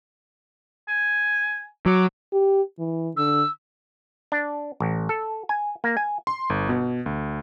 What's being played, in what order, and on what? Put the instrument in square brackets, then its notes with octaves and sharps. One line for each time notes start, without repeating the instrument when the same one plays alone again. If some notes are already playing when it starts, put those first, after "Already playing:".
[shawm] G#5
[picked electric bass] F#3 [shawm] D6
[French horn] G4
E3
[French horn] D3 [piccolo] E6
[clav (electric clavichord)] D4
A1
A4
G#5
A#3
G#5
[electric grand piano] C6
G1
B2
D2